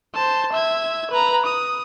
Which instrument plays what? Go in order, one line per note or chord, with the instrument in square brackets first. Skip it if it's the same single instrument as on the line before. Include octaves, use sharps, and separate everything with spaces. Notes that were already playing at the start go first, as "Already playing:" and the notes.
[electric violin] C5 A5
E5 G#6
B4 A#5
D#6